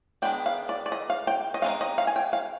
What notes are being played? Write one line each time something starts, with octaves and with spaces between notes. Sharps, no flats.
D#3 G#3 B3 D4 G5
F5
D5
D5
D#5
F5
G5
D#5
G#3 C4 D#4 F5
D#5
F5
G#5
G5
F5